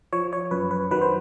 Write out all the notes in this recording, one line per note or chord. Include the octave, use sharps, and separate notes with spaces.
F3 C#5
C#5
F#2 B4
B4
D#3 F#3 B4
C5